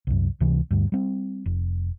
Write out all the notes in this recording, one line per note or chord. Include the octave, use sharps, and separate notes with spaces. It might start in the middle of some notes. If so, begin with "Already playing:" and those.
C2 F#2
C#2 C3 E3
D2 G2
G3 C4
F1